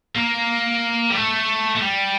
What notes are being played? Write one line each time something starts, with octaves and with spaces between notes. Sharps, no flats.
A#3
G3
A3
A3
G3